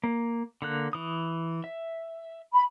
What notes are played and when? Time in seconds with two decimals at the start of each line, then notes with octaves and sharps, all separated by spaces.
0.04 A#3
0.62 D3 A#3 F#6
0.93 E3 D#6
1.64 E5
2.53 B5